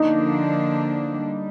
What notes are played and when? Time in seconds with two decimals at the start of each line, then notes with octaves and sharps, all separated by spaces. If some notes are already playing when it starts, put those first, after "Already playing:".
Already playing: D3 F3 A#3 D4 D#4
1.20 G3